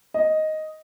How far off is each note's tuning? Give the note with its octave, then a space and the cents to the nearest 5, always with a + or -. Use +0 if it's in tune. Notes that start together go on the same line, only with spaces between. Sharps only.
D#5 +5